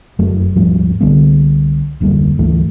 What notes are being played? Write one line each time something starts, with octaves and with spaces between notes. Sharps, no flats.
F1 F#2 F#3 A3
D#1 G#2 F3 G3
C2 D3 G3 B3
F1 D2 G3 A#3
D2 G#2 E3 A3